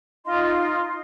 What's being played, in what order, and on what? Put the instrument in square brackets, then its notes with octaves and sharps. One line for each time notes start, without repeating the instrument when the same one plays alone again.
[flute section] D#4 F4 D#5 C6